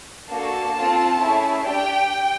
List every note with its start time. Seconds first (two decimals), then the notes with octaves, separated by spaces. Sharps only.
0.29 A#3 D4 F#4 A4 A5
0.75 C4 F4 A4
1.20 A3 C#4 E4 G#4
1.65 D4 G4 G5